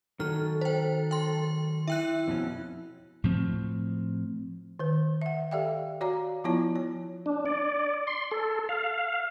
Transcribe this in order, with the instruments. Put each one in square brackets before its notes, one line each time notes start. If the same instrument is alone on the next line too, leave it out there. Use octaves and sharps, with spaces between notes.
[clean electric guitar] D#3 F#3 [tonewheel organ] A4 [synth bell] F6
[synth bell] C5 G5
G5 C6
[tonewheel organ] E4 [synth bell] E5 G5 F#6
[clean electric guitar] F2 B2 C#4
[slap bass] A2 F3 C4
[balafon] D#3 B4
E5 F#5
G4 A4 D5 E5 F5 G5
F#4 C#5 D5 F5 A#5
F3 B3 E4 F4 C#5 A5
C#5
[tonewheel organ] D4
D5
C6
A4
F5